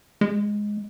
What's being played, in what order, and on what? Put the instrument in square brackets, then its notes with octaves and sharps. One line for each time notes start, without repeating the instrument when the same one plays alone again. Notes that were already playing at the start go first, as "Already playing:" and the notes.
[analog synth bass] G#3